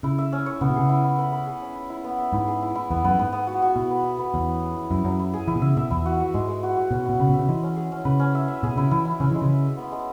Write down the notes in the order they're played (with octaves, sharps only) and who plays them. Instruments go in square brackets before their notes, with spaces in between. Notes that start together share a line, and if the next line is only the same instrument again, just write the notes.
[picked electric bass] C#3 [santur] E4
[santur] E5
C#4
C#5
[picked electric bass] C#3 [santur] B3
[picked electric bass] B2
[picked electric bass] C#3 [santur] G#4
[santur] E4
E4
B4
B4
G#4
C#4
E4
E4
B3
E5
[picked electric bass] G#2 [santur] E4
[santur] G#4
E4
E4
[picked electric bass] E2 [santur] B3
[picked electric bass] F#2 [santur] B3
[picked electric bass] G#2 [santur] B3
[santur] B3
F#4
F#4
[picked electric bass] B2 [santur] E4
[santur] B4
E4
B4
[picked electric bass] E2 [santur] C#4
[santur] E4
G#4
E4
[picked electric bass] F#2 [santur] E4
[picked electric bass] F#2 [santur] F#3
[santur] E4
G#4
[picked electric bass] E3 [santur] E4
[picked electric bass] B2
[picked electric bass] C#3 [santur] E5
[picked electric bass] B2 [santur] E5
[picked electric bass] E2 [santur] E4
[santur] F#4
F#4
[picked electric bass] G#2 [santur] G#3
[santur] G#3
F#4
F#4
[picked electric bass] B2 [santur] C#4
[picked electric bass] B2 [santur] E4
[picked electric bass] C#3 [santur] B4
[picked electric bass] B2 [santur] E5
[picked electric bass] C#3
[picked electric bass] E3 [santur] G#3
[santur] C#4
G#4
C#4
[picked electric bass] C#3 [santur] B4
[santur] C#4
E5
E5
[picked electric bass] B2 [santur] G#4
[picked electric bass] C#3 [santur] E4
[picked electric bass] E3 [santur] E4
[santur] E4
[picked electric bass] C#3 [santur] C#4
[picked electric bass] E3 [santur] G#3
[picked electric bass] C#3
[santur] E5
E5
B3
G#3